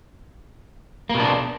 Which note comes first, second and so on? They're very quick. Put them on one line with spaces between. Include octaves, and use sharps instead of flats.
A#3 B2 D4